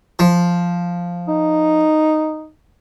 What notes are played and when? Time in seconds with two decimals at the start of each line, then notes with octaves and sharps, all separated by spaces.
0.19 F3
1.28 D#4